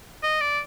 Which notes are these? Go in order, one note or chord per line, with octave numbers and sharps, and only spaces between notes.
D#5
D5